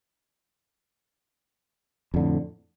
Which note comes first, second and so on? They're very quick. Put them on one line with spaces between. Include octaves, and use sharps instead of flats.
F2 D3 A2